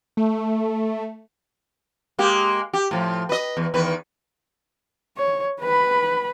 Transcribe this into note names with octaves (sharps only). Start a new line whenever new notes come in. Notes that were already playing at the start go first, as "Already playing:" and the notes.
A3
G#3 A#3 G4
G4
A2 F3
B4 D#5
E2
E2 D#3 B4
C#5
B4 B5